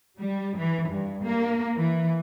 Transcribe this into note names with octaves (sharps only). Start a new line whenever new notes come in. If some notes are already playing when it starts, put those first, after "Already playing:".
G3
E3
G2
A#3
E3